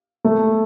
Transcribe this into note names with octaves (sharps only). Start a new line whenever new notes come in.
A3